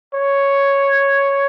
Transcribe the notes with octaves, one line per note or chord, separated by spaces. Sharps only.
C#5